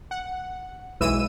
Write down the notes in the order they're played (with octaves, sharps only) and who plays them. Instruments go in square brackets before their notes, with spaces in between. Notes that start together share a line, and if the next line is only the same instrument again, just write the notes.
[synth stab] F#5
B1 E3 G#3 E6 D#7